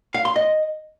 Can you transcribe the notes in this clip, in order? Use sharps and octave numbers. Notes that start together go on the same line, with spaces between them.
F5
C6
D#5